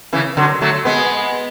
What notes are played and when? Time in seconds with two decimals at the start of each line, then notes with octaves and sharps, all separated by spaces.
0.13 C#3 E3
0.37 D3 F#3
0.61 F#3 A3
0.85 G#3 B3